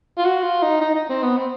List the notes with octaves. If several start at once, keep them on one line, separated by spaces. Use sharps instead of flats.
F4
F#4
F4
D#4
D#4
D#4
C4
B3
C4